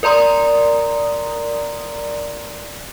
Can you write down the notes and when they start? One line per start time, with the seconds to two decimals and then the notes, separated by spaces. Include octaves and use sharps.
0.03 A#4 D5 A#5 C6 D#6